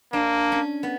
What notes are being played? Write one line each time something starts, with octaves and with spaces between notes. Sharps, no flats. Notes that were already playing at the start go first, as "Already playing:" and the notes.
A#3 D4
C#4
B3